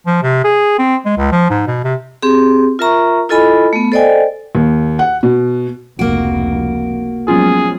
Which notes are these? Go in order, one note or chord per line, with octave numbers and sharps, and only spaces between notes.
F3
C3
G#4
C4
G#3
C#2
F3
G#2
B2
C3
C4 G4 G#4
F4 A#4 E5 A#5 C#6
E4 F4 A4 D#5 G#5 B5
A3 B3
A4 C5 D5 D#5 G5 G#5
D#2
F#5
B2
F1 C#2 A#3 F#4 D7
F3 F#3 G#3 B3 C#4 F4 G#4